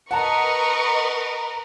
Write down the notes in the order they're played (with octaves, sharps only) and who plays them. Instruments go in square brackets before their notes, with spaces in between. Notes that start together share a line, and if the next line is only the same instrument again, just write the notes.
[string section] A#4 B4 [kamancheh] D#5 C#6 [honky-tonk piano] F#5 A5 A#5